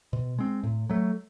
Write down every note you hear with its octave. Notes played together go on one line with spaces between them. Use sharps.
B2
G#3 C4
A2
F#3 A3